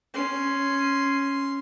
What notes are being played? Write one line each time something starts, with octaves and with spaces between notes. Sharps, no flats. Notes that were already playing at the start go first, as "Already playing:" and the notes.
C#4 C6